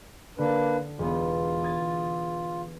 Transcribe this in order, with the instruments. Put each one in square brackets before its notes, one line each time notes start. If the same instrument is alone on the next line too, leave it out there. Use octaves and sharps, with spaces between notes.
[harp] D3 [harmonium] A#3 D4 B4
[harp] E1 B3 [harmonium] F4
[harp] D#6 G#6 A6